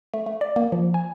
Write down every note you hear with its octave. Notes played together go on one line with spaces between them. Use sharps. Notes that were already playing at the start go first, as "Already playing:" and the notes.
A3
A3
D5
A#3
F3
G#5